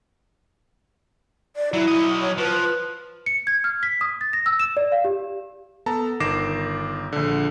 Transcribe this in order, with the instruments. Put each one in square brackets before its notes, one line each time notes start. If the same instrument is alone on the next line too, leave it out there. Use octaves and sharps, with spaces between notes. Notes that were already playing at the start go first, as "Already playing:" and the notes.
[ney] D5
[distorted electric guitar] F#3 [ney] E4
[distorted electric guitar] F#3 D#5
[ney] C#5
[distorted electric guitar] F3 [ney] B4
[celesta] C#7
G#6
F6
B6
D#6
A6
A#6
E6
E7
D5
F5
G4
[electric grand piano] B3 A4 A5 A#5
G1 D#3 D6 A#6 C7 E7
A#1 D3